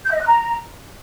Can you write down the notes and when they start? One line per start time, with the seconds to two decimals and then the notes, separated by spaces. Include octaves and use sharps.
0.05 G6
0.10 E5
0.15 D#5
0.21 F#6
0.26 A#5